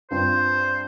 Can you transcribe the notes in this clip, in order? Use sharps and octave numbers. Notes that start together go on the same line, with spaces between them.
G2 G3 C4 F4 C5